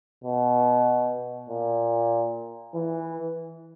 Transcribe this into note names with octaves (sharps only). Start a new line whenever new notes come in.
B2
A#2
E3